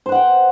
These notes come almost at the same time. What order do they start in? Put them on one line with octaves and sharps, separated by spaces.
C5 B4 F#5 G5